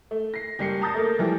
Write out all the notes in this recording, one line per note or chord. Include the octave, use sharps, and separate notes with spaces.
A3
A#6 C7
F#1 G3 C7 C#7
A5 A#5 D#6 G6 A6 A#6
A3 A#3
E3 F3 G3 A3